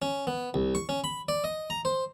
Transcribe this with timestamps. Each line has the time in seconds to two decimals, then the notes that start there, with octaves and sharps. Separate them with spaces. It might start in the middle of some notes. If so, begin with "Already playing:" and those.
0.02 C#4
0.27 B3
0.54 C2
0.75 C#6
0.89 C#4
1.04 B5
1.28 D5
1.44 D#5
1.70 A#5
1.85 C5